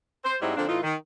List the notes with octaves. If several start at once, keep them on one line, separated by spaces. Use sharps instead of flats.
C5
G#2 F#3 G3 C4 E4 D#5
D3 F3 A#3 C4 D4
A2 E3 D#4 F4
D#3